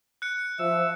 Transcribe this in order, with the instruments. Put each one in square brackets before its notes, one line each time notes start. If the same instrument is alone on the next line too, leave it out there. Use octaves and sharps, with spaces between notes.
[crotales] F#6 C#7
[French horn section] F3 [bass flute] E5 [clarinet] E6